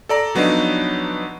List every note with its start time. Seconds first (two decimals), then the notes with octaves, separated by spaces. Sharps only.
0.09 A4 D5 A#5
0.35 F3 F#3 B3 D4 D#4